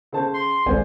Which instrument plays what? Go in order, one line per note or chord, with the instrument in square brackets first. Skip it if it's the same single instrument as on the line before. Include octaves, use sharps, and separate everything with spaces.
[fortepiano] C#3 C5 A5
[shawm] C6
[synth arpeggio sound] G#1 C#2 [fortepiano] C5 D5 G#5